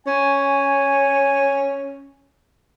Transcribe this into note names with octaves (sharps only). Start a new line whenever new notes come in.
C#4 G#5